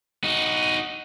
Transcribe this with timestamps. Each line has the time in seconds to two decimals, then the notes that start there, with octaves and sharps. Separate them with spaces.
0.24 D#4 F#4